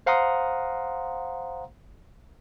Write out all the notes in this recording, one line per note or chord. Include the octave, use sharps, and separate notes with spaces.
C5 F5 F#5 A#5 C6 D#6